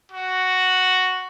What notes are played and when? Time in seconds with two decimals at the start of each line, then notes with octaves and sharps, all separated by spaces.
0.12 F#4